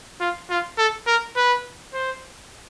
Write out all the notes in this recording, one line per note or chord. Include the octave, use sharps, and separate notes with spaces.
F4
F4
A4
A#4
B4
C5